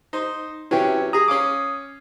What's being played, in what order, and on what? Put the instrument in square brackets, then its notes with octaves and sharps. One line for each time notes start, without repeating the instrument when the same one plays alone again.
[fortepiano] D#4 C5
[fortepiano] C3 F#3 C#4 [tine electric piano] E4 B4 G5
[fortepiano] G#4 A#5 [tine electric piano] D#6
[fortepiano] C#4 F5 D6